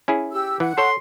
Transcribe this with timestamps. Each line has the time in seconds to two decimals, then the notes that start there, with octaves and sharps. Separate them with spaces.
0.08 C#4 E4 G#4
0.32 G4 E6
0.60 E3 F#5
0.78 A4 C#5 C6